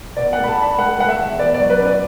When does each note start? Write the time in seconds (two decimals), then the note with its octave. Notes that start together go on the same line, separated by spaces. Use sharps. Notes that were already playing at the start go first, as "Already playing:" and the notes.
0.17 B2 D5
0.33 A3 F#5
0.44 B5
0.48 A5
0.58 D4 B5
0.78 A3 F#5
0.98 A3 F#5
1.08 E5
1.19 E2
1.39 B3 D5
1.54 D5
1.60 F#3
1.70 B4
1.80 F#2
1.85 D5